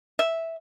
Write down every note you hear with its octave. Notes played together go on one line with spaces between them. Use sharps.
E5